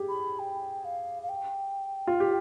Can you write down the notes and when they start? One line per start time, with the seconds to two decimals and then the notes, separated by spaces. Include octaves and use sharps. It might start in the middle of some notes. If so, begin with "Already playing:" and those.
Already playing: G4 G#4
0.09 B5
0.39 G5
0.85 F5
1.23 F5
1.29 G5
2.07 F4
2.20 G4